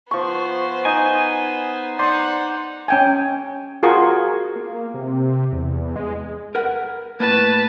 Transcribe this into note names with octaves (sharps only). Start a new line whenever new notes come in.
F3 B3 C5 C#6
D#4 G#5
D#4 C5 D5 F#5 C6
C#4 G5 G#5
F4 F#4 G#4 A#4 C#6
A#3
C3
E2
G#3
A#4 B4 F#5
A2 A#3 B4 A5